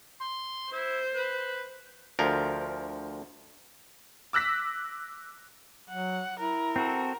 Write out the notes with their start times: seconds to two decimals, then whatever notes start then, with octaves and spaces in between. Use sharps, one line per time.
0.20 C6
0.72 E4 C5
1.14 B4
2.19 D2 F3 A#4
4.33 D6 E6 F#6 A#6 B6
5.89 F#3 F#5
6.39 E4 A#4
6.76 C4 F#4 A4